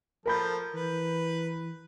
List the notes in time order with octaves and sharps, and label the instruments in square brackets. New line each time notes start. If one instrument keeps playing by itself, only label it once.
[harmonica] F3 A4 [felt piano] A#4 B5 G6
[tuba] E3 [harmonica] B4